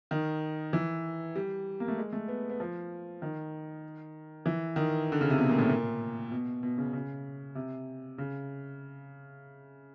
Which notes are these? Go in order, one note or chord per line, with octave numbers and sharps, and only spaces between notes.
D#3
E3
G3
A#3
A3
G#3
A3
B3
B3
F3
D#3
E3
D#3
D3
C#3
C3
B2
A#2
A2
A#2
B2
B2
C#3
C#3
C3
C#3